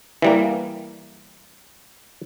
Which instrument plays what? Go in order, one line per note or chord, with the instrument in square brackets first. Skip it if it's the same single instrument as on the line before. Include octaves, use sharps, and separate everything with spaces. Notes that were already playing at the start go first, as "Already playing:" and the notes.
[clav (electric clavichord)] E3 G3 A#3